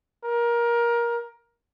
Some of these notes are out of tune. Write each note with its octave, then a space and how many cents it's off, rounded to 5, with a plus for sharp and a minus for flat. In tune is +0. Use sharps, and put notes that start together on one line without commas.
A#4 +20